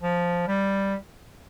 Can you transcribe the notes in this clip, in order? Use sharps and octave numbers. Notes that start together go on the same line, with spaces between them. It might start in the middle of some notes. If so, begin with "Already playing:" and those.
F3
G3